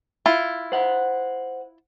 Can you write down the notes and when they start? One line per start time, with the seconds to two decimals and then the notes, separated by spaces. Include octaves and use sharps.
0.26 E4 F4
0.72 C5 F#5